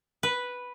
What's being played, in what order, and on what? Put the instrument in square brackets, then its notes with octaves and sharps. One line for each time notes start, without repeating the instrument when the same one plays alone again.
[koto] B4